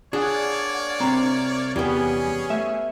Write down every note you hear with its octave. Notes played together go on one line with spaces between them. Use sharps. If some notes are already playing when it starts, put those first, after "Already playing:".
A#3 D4 G#4 C#5 D5 F#5
C2 C4 A#5
E2 G3 B3 C#4 G#4 C#5
A3 E5